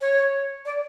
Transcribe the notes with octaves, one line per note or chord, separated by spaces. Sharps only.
C#5
D5